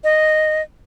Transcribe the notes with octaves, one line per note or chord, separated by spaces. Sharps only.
D#5